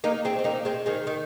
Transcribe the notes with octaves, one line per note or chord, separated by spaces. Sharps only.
A#3 D#4
G#3 C4
C4
A#3 D#4
G#3 C4
D#3 G#3
D#3